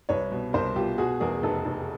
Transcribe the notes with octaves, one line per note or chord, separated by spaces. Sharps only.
C2 B4 C#5
B2
C2 A#4 C5
B2 F4 G4
B2 F#4 G#4
E2 G#4 A#4
F1 A4 B4
F1